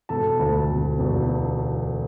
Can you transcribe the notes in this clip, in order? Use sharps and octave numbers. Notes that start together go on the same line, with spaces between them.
E1 A4 A5
D2
E1
E1